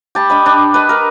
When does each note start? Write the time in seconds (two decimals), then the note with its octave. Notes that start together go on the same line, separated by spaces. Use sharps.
0.15 G4 A5 B5
0.30 D4 D#5 B5
0.46 D4
0.74 B4 D#5
0.89 A#4 B4